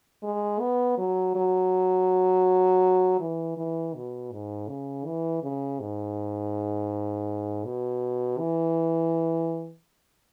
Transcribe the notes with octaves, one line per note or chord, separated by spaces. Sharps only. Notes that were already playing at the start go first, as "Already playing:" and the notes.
G#3
B3
F#3
F#3
E3
E3
B2
G#2
C#3
E3
C#3
G#2
B2
E3